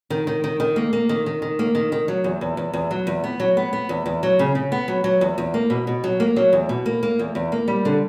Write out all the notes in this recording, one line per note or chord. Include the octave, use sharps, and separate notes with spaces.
D#3
D#3
D#3
D#3
A#3
A#3
D#3
D#3
D#3
A#3
D#3
D#3
F#3
E2
E2
E2
E2
F#3
E2
B3
F#3
B3
B3
E2
E2
F#3
C#3
C#3
B3
F#3
F#3
E2
E2
A#3
B2
B2
F#3
A#3
F#3
E2
B2
A#3
A#3
E2
E2
A#3
G3
D3